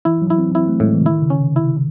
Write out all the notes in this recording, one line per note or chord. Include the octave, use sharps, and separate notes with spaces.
E3 E4
F#3
E4
C4
C4 E4
A3
A2 G#3
E3
C#3
D#3 E4
C#3
C#4
C3
C3 E4